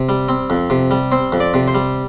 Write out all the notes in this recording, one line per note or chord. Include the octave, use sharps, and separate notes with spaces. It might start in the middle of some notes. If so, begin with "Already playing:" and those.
Already playing: C3
G3
C4
F2
C3
G3
C4 C5
F2
D5
C3
C5
G3